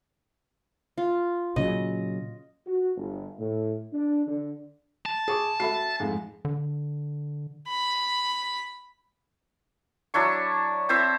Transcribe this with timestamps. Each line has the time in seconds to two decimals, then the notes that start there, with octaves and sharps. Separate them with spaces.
0.98 F4
1.56 A#2 C#3 F#3 D#5
2.66 F#4
2.96 G1
3.39 A2
3.93 D4
4.27 D3
5.06 A5
5.28 G#4 C#6 D6
5.60 F#4 A4 E5 B5 C7
6.00 F2 G#2
6.45 D3
7.68 B5
10.14 F#3 D4 E4 C#6
10.89 C4 E4 C5 E5